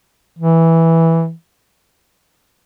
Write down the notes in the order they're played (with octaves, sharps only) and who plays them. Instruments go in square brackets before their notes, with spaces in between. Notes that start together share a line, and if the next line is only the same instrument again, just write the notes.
[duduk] E3